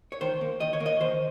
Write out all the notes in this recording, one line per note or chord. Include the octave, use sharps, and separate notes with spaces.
C#5
D#3 C5
A#3
D#3 D#5
C#5
A#3
D#5
D#3 C5